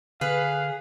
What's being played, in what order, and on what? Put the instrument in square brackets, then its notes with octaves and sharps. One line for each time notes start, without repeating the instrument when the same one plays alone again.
[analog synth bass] D3 [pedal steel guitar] G#4 [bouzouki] B4 [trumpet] F5